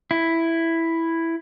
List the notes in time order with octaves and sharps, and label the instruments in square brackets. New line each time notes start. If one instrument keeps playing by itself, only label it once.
[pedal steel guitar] E4